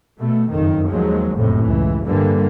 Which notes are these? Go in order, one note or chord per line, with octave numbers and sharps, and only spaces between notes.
B2 A3
F#1 F2 D#3
D#2 F3 F#3 G#3
F#1 F2 A2 C3
C#2 E3
G2 D3 E3 G3 A#3